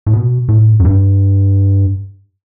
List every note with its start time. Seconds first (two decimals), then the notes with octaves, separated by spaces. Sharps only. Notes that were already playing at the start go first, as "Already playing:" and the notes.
0.06 A2
0.13 B2
0.48 A2
0.80 F#2
0.85 G2